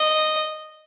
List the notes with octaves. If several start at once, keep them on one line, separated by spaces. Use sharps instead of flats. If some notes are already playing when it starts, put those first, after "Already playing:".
Already playing: D#5